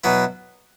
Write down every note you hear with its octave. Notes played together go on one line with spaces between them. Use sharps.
B2 F#3 B3 E4